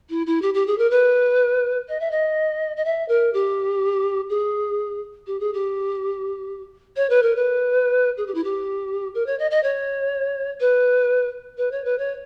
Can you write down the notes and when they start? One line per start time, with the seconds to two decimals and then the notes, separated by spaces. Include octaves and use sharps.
0.09 E4
0.26 E4
0.41 G4
0.54 G4
0.67 G#4
0.78 A#4
0.90 B4
1.88 D#5
2.00 E5
2.11 D#5
2.76 D#5
2.85 E5
3.08 A#4
3.33 G4
4.29 G#4
5.26 G4
5.39 G#4
5.53 G4
6.96 C#5
7.09 B4
7.22 A#4
7.36 B4
8.17 G#4
8.26 G4
8.34 E4
8.44 G4
9.14 A#4
9.26 C#5
9.38 D#5
9.50 D#5
9.63 C#5
10.60 B4
11.57 B4
11.71 C#5
11.84 B4
11.98 C#5